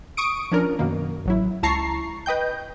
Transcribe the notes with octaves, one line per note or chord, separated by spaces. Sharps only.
C#6 D#6 D7
F3 C#4 D4 A#4
F#2 B2 D#3 A#3
A1 F#3 E4
C#2 E4 A5 A#5 C#6 C7
B4 D#5 G5 G6